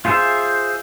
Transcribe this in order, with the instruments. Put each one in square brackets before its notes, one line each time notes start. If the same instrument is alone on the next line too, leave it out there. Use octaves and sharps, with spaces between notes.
[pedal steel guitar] F4 G#4 C5 E5